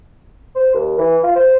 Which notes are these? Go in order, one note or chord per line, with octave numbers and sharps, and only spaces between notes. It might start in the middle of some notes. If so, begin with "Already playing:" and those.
C5
D#2
E3
F4
C5